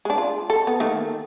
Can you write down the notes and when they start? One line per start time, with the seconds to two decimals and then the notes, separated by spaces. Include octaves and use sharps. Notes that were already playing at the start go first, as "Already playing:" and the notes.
0.05 G#3 D4
0.18 F4
0.50 A4
0.67 B3
0.80 D#3 A3 A#3